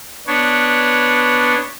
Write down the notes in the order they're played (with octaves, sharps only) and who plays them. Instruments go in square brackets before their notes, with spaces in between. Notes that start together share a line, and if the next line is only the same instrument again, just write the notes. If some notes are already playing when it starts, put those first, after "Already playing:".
[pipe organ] B3 D4 C#5